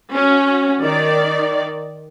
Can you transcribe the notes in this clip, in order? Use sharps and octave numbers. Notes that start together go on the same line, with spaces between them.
C#4 F#4
D#3 D5